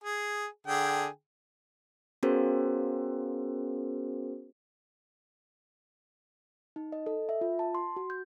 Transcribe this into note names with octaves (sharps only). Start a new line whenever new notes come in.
G#4
D3 G#4 G5
B3 C#4 F#4 G#4 A#4 C5
D#4
D#5
A4
E5
F4
A5
C6
F#4
G6